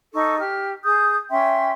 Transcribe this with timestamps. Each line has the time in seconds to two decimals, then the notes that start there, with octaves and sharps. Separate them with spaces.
0.14 D#4 A4 C#6
0.40 G4 F6
0.84 G#4 D#6 G6
1.31 C#4 E5 G5 C6